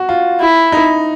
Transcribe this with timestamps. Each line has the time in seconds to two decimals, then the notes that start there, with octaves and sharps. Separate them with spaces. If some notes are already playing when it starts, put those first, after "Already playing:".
Already playing: F#4
0.09 F4
0.41 E4
0.72 D#4